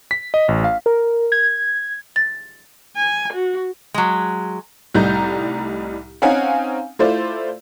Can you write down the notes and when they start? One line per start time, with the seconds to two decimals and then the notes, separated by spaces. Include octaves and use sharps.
0.11 B6
0.34 D#5
0.48 A1
0.64 F5
0.86 A#4
1.32 G#6
2.16 A6
2.96 G#5
3.33 F#4
3.94 F#3 G#3
4.95 C2 A2 G3 D#4 A#5 G6
6.22 C4 C#4 D#4 F5 F#5 G#5
6.99 A3 E4 F4 C5 D5